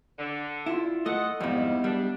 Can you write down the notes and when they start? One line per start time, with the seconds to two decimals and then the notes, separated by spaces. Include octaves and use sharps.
0.19 D3
0.66 E4 F4
1.06 A3 D#5 F#5
1.41 F2 G#2 D#3 G3 B3 E4
1.84 G3 D4